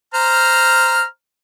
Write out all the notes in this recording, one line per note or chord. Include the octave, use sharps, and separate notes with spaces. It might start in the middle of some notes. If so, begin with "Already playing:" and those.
C5 A#5 F6